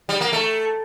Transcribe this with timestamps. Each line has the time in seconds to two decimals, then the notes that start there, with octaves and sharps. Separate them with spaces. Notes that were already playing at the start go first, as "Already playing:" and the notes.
0.09 G3
0.21 A#3
0.33 A3